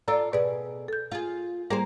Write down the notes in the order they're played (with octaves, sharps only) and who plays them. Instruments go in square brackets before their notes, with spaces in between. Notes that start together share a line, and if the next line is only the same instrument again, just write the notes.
[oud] F4 A4 D5 [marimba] A#5 E6
[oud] B2 G#4 [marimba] B4 D5
[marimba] A4 G6
[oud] F4 G#4
[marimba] G3 [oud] A#3 G#4 C5